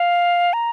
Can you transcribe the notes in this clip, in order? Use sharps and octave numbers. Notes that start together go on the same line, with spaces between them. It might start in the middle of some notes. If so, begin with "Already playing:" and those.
Already playing: F5
A#5